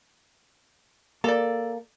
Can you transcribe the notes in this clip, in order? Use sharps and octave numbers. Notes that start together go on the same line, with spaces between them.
A#3 A4 D5